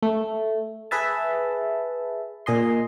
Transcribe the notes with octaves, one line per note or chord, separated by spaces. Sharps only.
A3
G#4 B4 E5 A5
A#2 G#4 D#5 C6